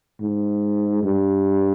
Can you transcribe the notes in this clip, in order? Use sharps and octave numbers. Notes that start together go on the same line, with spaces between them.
G#2
G2